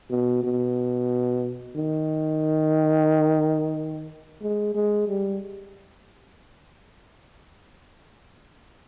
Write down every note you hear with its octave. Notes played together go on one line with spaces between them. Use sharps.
B2
B2
D#3
G#3
G#3
G3